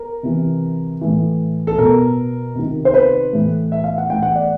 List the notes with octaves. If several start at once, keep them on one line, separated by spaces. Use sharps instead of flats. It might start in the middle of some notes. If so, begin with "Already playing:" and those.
Already playing: A#4
C3 E3
A2 E3
A4
B2 A#4
C3 D#3
C5
B4
A2 E3
E5
F5
F#5
A2 E3 G5
F#5
D5